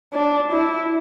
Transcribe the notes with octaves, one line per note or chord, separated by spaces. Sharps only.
D4
E4